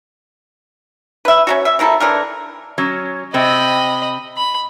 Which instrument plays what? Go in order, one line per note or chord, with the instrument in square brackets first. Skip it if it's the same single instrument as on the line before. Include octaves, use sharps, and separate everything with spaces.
[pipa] B4 E5
C#4 D4 F#4
E5
C3 A#3 E4 A4
D3 E3 A#4
[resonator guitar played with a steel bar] F#3 C#4
[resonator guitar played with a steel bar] C3 C4 [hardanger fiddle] D#5 B5
[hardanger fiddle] B5